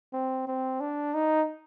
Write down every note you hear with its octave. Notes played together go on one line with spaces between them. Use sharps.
C4
C4
D4
D#4